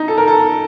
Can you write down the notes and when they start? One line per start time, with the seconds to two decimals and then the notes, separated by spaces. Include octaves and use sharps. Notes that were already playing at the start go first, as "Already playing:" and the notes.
Already playing: D#4
0.08 A4
0.18 A#4
0.28 A4